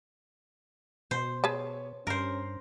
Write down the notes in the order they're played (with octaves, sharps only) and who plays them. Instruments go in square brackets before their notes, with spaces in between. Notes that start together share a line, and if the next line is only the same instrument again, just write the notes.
[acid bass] B2 [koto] C5
[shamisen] G#4 B4 A5 [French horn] C#5
[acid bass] G2 [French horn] C#4 [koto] A#4 C5